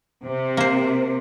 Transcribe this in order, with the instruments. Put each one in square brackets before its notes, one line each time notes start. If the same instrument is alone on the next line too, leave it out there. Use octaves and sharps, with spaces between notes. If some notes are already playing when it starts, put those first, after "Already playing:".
[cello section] C3
[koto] A#3 C5